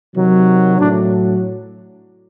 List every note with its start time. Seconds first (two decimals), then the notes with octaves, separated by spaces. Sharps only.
0.15 C3 D#3 F#3
0.78 A2 F#3 D4